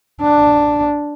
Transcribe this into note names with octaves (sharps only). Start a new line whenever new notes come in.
D4